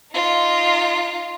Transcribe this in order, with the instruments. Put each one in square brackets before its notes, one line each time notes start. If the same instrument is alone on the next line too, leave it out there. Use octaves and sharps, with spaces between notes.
[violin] D#4 F4